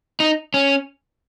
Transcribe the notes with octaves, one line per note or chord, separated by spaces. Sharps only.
D#4
C#4